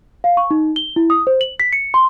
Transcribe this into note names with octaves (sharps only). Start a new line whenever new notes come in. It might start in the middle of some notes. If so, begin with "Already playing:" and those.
F5
C#6
D#4
G7
E4
D#6
C5
F#7
B6
C#7
C6